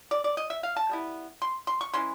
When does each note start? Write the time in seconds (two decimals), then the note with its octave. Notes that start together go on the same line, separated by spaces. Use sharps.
0.11 D5
0.24 D5
0.37 D#5
0.50 E5
0.63 F5
0.76 A5
0.89 G3 B3 E4
1.42 C6
1.67 C6
1.81 C#6
1.93 E3 G#3 C#4 C6